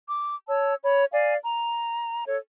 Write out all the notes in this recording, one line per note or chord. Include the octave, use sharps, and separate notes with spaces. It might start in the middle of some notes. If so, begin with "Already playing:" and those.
D6
C#5 A5 E6
C#5 B5
D5 F5 G#5
A#5
A4 C#5